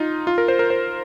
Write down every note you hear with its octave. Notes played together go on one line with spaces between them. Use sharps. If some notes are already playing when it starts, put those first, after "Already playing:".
Already playing: D#4 F4
F4
A#4
C5
A#4
C5